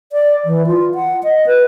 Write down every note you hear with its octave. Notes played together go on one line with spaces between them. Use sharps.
D5
E3
F4
F#5
D#5
B4